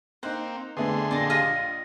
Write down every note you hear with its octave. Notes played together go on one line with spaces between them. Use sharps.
A#3 C4 D#4 C5 F#6
F2 D3 A3 B3 G#4 C6
F2 A#2 D5 D#5
F4 G4 D#5
A#1